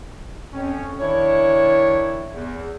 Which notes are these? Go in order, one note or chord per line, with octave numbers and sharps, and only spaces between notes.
F2 C#4
D#3 D4 E4 C#5
E2